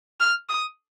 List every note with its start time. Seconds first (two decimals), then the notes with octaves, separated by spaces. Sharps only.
0.20 F6
0.49 D#6